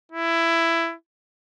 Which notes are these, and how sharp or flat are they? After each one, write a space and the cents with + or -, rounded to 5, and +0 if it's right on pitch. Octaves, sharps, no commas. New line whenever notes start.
E4 +15